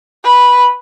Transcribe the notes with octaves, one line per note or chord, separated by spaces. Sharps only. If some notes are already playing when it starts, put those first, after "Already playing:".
B4